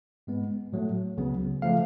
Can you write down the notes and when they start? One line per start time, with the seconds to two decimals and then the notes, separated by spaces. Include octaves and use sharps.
0.27 G#2 G#3 B3
0.72 A2 F#3 A3
1.17 C#2 C#3 F#3 B3
1.62 C#3 F3 A3 F5